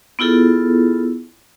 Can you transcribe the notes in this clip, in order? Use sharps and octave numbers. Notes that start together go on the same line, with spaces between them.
B3 E4 F4 G#4 A4